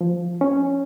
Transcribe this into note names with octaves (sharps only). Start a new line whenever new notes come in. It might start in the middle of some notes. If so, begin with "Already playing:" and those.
F3
C#4